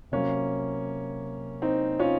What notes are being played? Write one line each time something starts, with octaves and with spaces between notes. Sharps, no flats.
C3 F#3 A#3 C#4
C4 D#4
C#4 F4